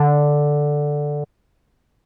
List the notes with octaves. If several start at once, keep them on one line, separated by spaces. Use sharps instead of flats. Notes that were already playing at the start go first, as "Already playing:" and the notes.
Already playing: D3